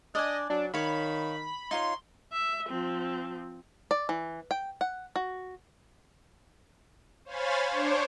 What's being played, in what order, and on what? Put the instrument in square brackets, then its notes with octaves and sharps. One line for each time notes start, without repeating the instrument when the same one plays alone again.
[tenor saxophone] D4 [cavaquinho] D5 G#5 [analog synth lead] D#5
[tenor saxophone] F#3 [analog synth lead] D4
[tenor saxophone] D#3 [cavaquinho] C#5 F5 [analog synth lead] B5
[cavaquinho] D#4 F4 C#5 [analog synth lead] C6
[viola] E5
F3 C4
[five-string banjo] D5
E3
G5
F#5
F#4
[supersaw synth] C5 C#5 F5 G#5 B5 A6
D4 C5 C#5 D6